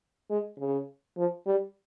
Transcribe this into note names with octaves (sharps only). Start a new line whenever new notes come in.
G#3
C#3
F3
G3